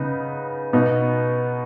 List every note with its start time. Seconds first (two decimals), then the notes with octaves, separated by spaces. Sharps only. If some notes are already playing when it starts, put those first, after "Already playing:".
Already playing: C#3 B3 D#4
0.73 B2 B3 D#4